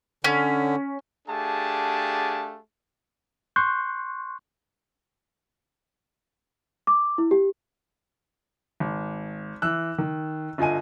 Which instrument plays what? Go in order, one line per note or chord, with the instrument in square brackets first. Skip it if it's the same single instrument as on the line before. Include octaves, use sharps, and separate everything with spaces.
[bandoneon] D3 [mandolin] C#4
[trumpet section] A3 D4 G4 G#4 F5 A5
[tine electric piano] C6 C#6 F#6 G6
[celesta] D6
E4
G4
[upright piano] G#1
E3 E6 F#6
D#3
G1 F4 D#5 G#5 D#7